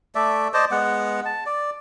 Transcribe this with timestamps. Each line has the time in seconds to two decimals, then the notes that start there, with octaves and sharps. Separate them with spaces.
0.15 A3 D5 E5
0.54 C5 D5 D#5 A5
0.71 G#3 B3 F#5
1.25 A5
1.46 D5